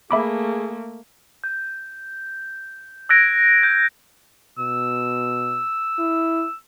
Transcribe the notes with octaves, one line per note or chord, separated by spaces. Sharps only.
A3 A#3 G#4 E5 B5 D6
G6
E6 F#6 G#6 A#6 D7
G6
B2 E6
E4